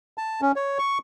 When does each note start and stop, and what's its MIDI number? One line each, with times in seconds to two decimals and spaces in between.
0.18 0.41 81
0.41 0.52 61
0.56 0.78 73
0.79 0.98 85